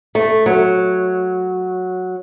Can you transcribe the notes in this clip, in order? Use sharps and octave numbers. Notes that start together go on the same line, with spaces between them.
A3
F#3